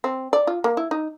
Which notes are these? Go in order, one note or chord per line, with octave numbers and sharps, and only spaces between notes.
C4
D5
F4
A#3
E4
D#4